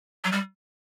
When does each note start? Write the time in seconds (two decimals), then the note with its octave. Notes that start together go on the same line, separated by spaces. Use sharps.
0.24 F#3
0.32 G3